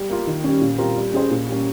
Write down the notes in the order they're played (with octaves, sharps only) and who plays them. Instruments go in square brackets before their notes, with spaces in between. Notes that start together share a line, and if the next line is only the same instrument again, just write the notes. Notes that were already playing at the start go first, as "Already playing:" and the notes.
Already playing: [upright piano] G3
A#3 F4
D#3
G3 C#4
A#2
G3 C4 F4 A#4
G3
C#4 G#4 C5
A#2
G3 A#3 C#4